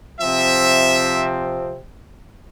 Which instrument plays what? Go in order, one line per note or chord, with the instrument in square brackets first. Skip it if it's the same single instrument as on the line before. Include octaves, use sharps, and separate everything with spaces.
[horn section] C3 F3 C4 E5